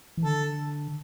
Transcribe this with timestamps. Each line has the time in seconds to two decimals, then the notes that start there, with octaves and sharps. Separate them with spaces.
0.17 E3
0.24 D3 A4